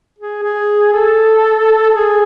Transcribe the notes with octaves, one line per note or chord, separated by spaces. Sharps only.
G#4
G#4
A4
G#4